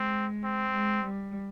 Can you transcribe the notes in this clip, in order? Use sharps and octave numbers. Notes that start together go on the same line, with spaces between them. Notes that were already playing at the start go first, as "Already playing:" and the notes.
Already playing: G#3 C4
C4
G#3
G3